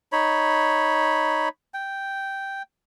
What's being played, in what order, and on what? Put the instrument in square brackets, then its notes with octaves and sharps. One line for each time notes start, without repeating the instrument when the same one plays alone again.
[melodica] D#4 C#5 B5
G5